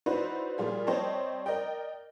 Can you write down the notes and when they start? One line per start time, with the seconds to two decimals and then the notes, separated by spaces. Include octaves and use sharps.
0.06 D#4 E4 F#4 B4 C5 D5
0.58 A#2 G3 F4 G#4
0.87 G3 C4 C5 C#5 D#5 A5
1.46 A#4 D5 D#5 G5